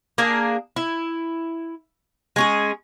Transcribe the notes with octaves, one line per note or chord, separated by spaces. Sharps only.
A#3 D4 G#4
E4
G#3 C#4 G#4